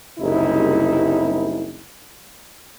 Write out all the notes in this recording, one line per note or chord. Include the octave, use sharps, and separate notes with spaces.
F#1 C2 D#4 E4